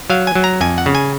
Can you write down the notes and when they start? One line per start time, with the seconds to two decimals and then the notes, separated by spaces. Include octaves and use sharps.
0.10 F#3 F5
0.27 G#5
0.35 F#3
0.44 A#5
0.61 F2 G#5
0.78 F#5
0.86 C#3
0.95 G#5